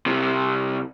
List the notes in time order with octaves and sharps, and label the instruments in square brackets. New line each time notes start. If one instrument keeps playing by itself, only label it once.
[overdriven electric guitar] C2 C3